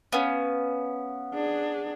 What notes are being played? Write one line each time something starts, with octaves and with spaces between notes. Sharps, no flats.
B3 C#4 B4 F5
D4 G#4